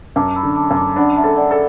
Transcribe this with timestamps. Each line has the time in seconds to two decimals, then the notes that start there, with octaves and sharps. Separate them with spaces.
0.16 F#2 A5 D6
0.36 B5 E6
0.43 D3
0.56 A5 D6
0.70 F#2
0.76 A5 D6
0.96 D4 F#5 B5
1.17 E5 A5
1.24 A4
1.37 D5 F#5
1.51 A4